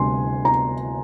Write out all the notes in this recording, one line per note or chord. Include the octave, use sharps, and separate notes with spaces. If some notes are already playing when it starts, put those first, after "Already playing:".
Already playing: D2 C3 G3 G#5 C6
A#5